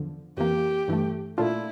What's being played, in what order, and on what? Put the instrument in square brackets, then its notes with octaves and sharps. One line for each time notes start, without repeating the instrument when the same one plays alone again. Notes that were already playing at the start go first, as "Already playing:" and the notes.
Already playing: [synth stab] E2 D3 F3
[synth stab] F2 E3 A#3 [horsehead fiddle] G4
[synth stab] G2 E3 A3
[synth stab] A#2 A3 D4 F4 [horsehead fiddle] E4